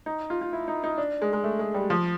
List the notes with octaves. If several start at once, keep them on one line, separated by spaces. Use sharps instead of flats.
D#4
F4
F4
E4
D#4
D#4
D4
G#3
G#3
A3
G#3
G3
F3